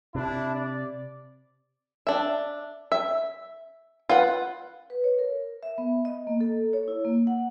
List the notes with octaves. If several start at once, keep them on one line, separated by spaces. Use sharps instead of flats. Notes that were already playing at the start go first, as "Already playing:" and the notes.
C3 D4 E4
D5
D4 E5
E5
F4 B4 F#5
B4
C#5
A#4
E5
B3
D#5
A#3
A4
C#5
E4
A#3
F#5